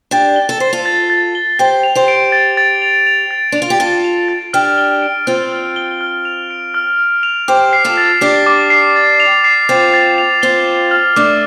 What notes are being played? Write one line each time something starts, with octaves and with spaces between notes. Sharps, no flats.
D4 G4 A6
G7
A4
C5 C7
F4 A4
A6
A6
G7
G4 C5 A6
F7
G4 C5
D7
A6
A6
F7
F7
A6
D4 F7
F4
G4
F4 A4 A6
F7
A6
D4 G4 F6
G7
D7
C4 F4 F6
F6
G7
F6
F7
D7
F6
F6
F7
G4 C5 D6
C7
F4 A4
A6
D4 G4 D6
D6
C7
A6
F7
C7
C4 F4 A6
A6
F7
C4 F4 G7
C7
F6
A3 D4 D6